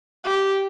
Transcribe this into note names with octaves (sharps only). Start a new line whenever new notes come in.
G4